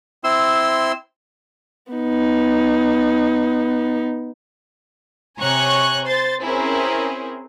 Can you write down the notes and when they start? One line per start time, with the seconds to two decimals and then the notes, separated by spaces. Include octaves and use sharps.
0.24 C4 E4 C6 E6
1.92 B3 D#4
5.40 C3 C#5 G#5 A#5 C#6 F#6
6.06 C5 C6 A6
6.42 C4 C#4 E4 G#4 A#4 C5